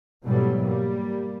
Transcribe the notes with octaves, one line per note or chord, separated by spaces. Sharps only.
G#2 B2 E3 F#3 G3 A3
G3 A#3